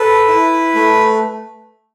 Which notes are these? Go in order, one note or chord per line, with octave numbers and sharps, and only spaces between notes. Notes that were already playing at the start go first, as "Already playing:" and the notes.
Already playing: A4 B4
E4
A3